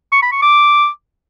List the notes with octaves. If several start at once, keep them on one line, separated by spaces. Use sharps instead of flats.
C#6
B5
C#6
D6